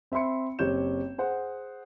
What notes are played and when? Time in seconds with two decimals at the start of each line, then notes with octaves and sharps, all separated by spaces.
0.12 C4 E5 B5 C6 C#7
0.59 F#1 C4 G4 C#5 G6 E7
1.18 G#4 C5 F#5